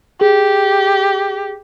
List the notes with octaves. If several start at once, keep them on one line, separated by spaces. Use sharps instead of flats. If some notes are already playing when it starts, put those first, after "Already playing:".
G4 G#4